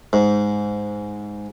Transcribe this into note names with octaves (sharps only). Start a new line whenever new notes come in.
G#2